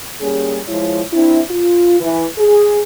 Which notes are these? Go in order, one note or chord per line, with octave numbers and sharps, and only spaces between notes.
G3 A#3 C#4 G#4
F3 G#3 E4 C#5
C4 D4 E4
F4
E3
G#4